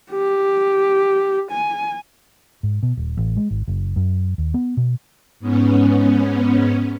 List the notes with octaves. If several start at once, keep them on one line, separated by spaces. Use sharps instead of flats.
G4
G#5
G#2
B2
D#1
A1
G#3
G#1
F#1
F#2
D#2
B3
B2
G#2 B3 C#4